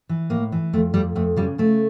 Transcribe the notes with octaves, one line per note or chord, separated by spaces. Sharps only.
E3
A2 A#3
E3
F2 A3
F2 G3
F2 A3
C#3 G3
C#3 A3